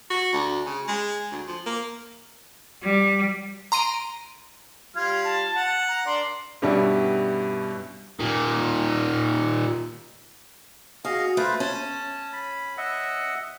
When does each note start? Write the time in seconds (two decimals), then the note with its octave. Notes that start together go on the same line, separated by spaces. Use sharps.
0.10 F#4
0.33 D2
0.66 C#3
0.88 G#3
1.31 D2
1.47 F3
1.66 A#3
2.83 G3
3.72 A#5 C6 D7 D#7
4.96 G3 F4 F6 G#6
5.24 A5
5.55 F#5
5.88 A#5
6.06 D4 A#4 D5 C6
6.62 G2 B2 G3 C#4 E4
8.19 A#2 D#3
11.05 F#4 G#4 D#5 F5
11.37 A3 F4 B4 C5
11.60 C#4 A5
12.33 B5
12.77 D#5 E5 F#5